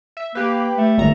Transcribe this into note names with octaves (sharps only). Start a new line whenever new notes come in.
E5
A#3 G4 B4
A3
G#1 A#5